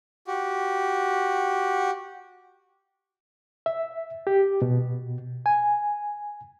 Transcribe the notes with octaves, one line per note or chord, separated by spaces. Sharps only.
F#4 G4
E5
G4
B2
G#5